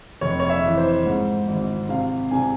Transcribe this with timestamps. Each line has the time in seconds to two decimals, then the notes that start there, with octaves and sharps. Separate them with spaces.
0.21 F1 C#5
0.40 C#5
0.50 E5
0.64 E3
0.78 C5
1.06 G#2
1.48 G#1
1.89 C3 F5
2.31 C3 G#5